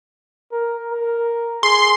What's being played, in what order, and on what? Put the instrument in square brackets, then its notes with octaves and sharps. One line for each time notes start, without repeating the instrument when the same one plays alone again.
[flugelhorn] A#4
A#4
[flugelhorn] G#4 [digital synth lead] C6